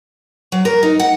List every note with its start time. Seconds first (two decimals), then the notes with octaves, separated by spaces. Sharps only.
0.52 F#3
0.65 A#4
0.83 D#4
1.00 F#5